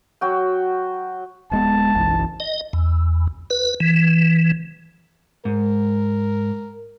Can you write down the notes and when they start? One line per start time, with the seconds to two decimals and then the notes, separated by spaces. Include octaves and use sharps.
0.21 F#3 F#4 G5
1.51 D1 G#3 B3 A5
1.95 F#1 B1 E3
2.40 D#5
2.73 E2
3.50 B4
3.80 E3
5.45 G#2 A#4